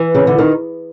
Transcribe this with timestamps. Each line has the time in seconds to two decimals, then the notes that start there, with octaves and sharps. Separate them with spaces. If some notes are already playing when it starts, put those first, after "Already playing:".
Already playing: E3
0.15 C#3
0.27 D3
0.38 D#3